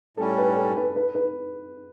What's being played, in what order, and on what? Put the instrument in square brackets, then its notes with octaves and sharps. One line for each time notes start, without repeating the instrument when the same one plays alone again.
[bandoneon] A2 G3 C#4 [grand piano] A4
[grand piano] B4
A4
B4
B4
B4